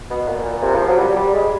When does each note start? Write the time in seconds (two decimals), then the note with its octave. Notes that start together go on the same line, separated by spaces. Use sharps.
0.10 B2
0.28 A#2
0.45 A#2
0.63 C3
0.75 F3
0.87 F#3
0.98 G3
1.16 G3
1.34 G#3